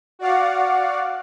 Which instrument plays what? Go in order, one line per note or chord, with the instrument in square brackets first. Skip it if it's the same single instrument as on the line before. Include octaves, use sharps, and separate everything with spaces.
[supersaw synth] F#4 D5 F5 F#5